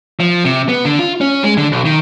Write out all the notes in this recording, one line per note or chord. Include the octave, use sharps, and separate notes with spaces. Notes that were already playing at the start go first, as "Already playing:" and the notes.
F3
C3
B3
D3
F4
C#4
G#3
D3
B1
D#3